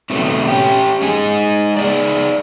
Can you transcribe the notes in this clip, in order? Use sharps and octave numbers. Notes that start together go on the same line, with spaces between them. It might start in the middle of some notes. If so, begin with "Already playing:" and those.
C3 D#3 F#3 A3 B3
C#4 G4
G#3 D#4 G#4
D#4 G#4 D5